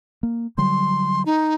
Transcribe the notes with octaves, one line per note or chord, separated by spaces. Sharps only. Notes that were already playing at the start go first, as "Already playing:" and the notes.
A#3
D3 F#3 G3 C6
D#4